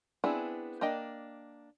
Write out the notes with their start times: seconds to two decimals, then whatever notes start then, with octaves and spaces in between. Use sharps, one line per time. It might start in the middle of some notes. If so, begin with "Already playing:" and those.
0.24 B3 C4 D4 E4 G#4
0.81 A#3 D4 D#5 G5